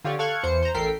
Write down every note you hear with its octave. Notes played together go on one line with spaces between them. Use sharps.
D3 F4 G4 C#5 D5
A4 F5 C#6 F#6 G#6
E2 C5 C#7
C5 A#5
A1 A4 A#4 G5 B6 C7